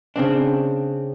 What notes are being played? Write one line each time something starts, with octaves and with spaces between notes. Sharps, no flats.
C#3 C4 D4